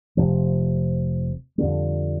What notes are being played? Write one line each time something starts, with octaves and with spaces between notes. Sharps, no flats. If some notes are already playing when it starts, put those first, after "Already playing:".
F1 F2 C3 F3
F2 D3 G3